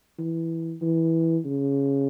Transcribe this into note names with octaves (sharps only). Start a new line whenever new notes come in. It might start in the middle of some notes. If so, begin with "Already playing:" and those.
E3
E3
C#3